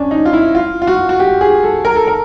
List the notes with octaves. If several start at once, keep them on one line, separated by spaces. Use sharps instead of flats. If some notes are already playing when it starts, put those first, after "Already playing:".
Already playing: C#4 D4
D#4
F4
E4
F4
F4
F#4
F#4
G4
G#4
A4
A#4
A4
A#4